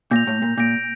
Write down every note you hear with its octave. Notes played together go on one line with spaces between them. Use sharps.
A#2 G6 A#6 F7
A2
A#2
A#2 G6 A#6 D7